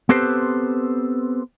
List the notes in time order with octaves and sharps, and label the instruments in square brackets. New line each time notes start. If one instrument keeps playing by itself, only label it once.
[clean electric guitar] B3 C4 G4 A4 B4 C5